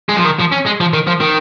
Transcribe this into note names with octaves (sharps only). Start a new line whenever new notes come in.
G#3
F3
D#3
F3
C#4
G#3
F3
D#3
F3
D#3